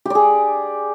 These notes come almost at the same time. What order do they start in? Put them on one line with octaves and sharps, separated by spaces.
G4 D5 G#4